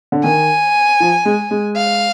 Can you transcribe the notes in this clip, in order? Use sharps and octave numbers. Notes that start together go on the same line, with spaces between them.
D3
D#3 G#5
F3
G#3
G#3
F5